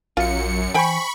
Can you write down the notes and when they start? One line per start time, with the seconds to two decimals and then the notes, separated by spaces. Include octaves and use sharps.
0.17 A#1 F#2 F4 C#7
0.74 E3 C5 G5 G#5 B5 C#6